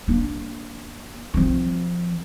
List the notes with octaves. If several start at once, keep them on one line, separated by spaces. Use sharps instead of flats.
A#3 D4
F3 C4